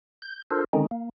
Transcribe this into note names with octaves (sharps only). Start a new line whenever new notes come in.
G6
D4 F4 A4 A#4 C5
D3 D#3 G#3 C4 C#4 D#4
A#3